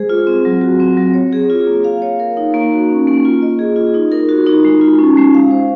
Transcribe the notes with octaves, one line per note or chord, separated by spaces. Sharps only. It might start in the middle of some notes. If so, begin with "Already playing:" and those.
Already playing: G#3 G#4 C5
F4
C4
F#3
F#4
C4
F#3
C#5
G#4
F4
A#3
F5
C#5
A#4
D#4
A#3
F#4
C#4
A#3
F4
D#5
G#4
F4
D#4
A#4
F#4
D#4
G#3
F4
C#4
G#3
F5
C5